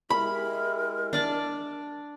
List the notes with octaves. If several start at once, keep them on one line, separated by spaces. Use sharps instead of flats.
G#3 E4 G4 A#4 B5
D4 D5 A5